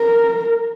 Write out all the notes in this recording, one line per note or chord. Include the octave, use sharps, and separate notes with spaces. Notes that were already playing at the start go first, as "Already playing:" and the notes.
Already playing: A#4